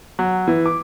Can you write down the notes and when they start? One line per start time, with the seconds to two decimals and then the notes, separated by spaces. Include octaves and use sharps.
0.19 F#3
0.48 E3
0.66 D6